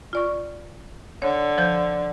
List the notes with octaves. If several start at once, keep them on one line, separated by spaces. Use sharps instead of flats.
F4 D5 C#6
D3 C#5
F3 C5 G6